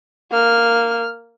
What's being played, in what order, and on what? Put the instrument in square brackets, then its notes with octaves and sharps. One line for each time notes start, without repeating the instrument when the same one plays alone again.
[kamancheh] A#3 F6